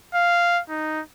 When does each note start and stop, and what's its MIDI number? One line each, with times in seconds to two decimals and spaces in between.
0.15 0.61 77
0.70 1.01 63